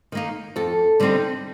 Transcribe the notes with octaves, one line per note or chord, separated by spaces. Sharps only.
D#3 A#3 D#4
F2 A4
D3 G3 C4 D#4